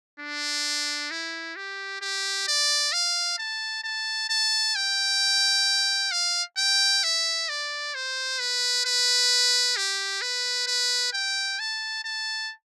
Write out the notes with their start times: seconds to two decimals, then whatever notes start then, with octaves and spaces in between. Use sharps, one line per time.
0.20 D4
1.11 E4
1.56 G4
2.02 G4
2.48 D5
2.93 F5
3.38 A5
3.84 A5
4.30 A5
4.76 G5
6.12 F5
6.57 G5
7.04 E5
7.49 D5
7.95 C5
8.39 B4
8.85 B4
9.77 G4
10.22 B4
10.67 B4
11.13 G5
11.59 A5
12.04 A5